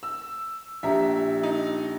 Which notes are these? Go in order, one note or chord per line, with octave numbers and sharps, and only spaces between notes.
E6
A#1 G4 E5 A#5
D#4